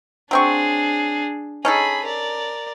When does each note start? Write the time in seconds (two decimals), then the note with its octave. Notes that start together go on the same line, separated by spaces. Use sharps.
0.31 F#3 C4 D4 G#4 C#6
1.65 C#4 D#4 G#4 A4 B5
2.05 A#4 D5